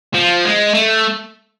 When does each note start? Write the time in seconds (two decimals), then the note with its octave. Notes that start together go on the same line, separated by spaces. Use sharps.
0.14 F3
0.45 G#3
0.75 A3